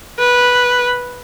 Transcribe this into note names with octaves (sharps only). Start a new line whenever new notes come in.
B4